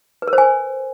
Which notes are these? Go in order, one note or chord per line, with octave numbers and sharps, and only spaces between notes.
B4
A#4
C5
G#5